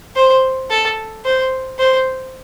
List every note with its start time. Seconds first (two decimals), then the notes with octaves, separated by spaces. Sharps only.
0.16 C5
0.70 A4
1.25 C5
1.79 C5